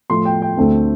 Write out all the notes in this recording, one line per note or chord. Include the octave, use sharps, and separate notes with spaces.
A2 F3 A3 C6
G5
G5
D2 D3 A3 C4